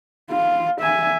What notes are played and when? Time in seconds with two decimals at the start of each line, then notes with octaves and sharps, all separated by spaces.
0.31 F4
0.82 E5 G#5